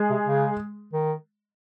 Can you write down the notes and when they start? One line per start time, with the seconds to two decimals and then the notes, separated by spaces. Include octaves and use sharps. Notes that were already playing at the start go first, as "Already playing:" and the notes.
Already playing: G#3 G#4
0.10 C3
0.27 C#3
0.93 D#3